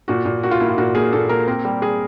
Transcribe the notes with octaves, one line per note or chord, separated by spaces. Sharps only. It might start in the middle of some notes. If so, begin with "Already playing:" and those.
A#2 F#4
A#2
A#3 F#4
F4
A#3 E4
F4
A#2 F#4
A#3 G#4
A#2 A4
A#3 A#4
C4 A#4
G3
G3 G#4